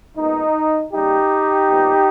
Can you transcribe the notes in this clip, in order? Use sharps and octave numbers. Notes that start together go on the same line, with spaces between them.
A#2 G#3 B3 D#4
C#3 G3 A#3 D#4 G4
A#2 G3 B3